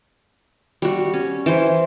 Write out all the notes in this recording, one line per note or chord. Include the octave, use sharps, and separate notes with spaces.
G3 F#4
C#4
E3 C5 C6